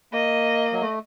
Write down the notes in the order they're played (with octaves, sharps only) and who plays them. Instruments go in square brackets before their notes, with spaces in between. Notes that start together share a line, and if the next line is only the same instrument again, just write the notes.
[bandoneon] A#3 [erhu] D#5
[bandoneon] F#3
A3